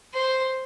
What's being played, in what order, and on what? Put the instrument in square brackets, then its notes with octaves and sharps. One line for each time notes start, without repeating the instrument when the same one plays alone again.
[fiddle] C5